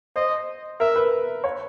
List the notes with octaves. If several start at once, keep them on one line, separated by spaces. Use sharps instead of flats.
C5 D#5
A#4 E5
B4
C#5